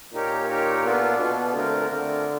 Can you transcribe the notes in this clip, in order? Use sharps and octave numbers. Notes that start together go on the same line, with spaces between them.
A#2 D#4 G4 A#4 C#5
D#4 G4 A#4 C#5
B3 D4 F4 A4
B2 B3 D4 F4 A4
D3 A3 C4 F4 A#4
D3 A3 C4 F4 A#4